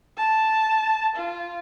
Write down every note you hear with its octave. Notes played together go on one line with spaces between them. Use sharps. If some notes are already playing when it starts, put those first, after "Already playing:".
A5
F4